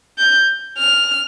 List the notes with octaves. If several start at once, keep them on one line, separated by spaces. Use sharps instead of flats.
G6
F6